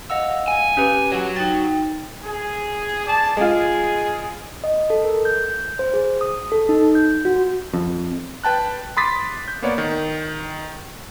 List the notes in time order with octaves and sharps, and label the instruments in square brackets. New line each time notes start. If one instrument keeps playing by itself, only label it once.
[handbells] D#5 F#5 E6 [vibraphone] F5
[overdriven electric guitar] G#5
[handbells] C#4 G4 B4
[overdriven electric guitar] F#4 C#5
[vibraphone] D#4 G5 [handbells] A6
[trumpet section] G#4
G#4 D5 A5
[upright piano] G#3 F4 [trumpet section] G#4
[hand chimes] D#5
A4
A#4
G6
G6
C5
G#4
D#6
A4
D#4
G6
F#4
[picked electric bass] F2
[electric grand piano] B4 G5 A5 F#6
B5 C6 D6 D#6 A6 B6
G6
A#3 B3 C#5 D5
D#3